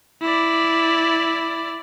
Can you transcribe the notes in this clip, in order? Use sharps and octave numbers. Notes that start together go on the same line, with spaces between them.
E4 D5